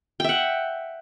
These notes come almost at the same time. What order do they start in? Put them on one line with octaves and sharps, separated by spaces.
G5 E5 F#5